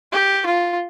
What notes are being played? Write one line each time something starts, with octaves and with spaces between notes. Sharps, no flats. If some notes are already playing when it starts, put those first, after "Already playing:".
G4
F4